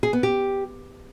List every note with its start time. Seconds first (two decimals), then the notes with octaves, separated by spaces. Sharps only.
0.03 G#4
0.13 B3
0.23 G4